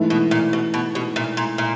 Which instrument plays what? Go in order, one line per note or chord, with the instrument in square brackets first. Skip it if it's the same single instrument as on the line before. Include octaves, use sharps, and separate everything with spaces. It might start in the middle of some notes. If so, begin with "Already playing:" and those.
Already playing: [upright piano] G#2 E3 A3
[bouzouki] B2
A#2
B2
B2
B2
A#2
A#2
A#2